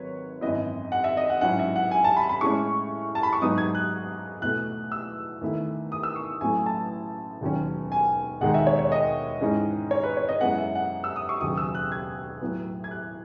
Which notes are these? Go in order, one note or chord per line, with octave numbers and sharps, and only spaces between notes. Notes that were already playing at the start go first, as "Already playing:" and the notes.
Already playing: G#1 D#3 F#3 B4 C#5
G#1 F#2 E3 B3 E4 D#5
F#5
E5
D#5
F#5
A1 G#2 F#3 C#4 E4 F#5
E5
F#5
G#5
A5
B5
B5
A2 G#3 C#4 C#6
A5
B5
C#6
G#2 F#3 B3 D#4 D#6
G#6
F#6
E2 B2 A3 F#6
E6
E2 D#3 A3 E4
D#6
E6
C#6
A1 A2 F#3 A3 G#5
A5
E1 D#2 D#3 F#3 C#4
G#5
E1 D#2 D#3 G#3 D#4 F#5
E5
C#5
C#5
D#5
G#2 E3 G#3 C#4
C#5
B4
C#5
D#5
F#2 E3 G#3 B3 F#5
E5
F#5
E6
D#6
C#6
E1 D#2 C#3 F#3 D#6
E6
F#6
G#6
A2 F#3 B3
G#6
F#6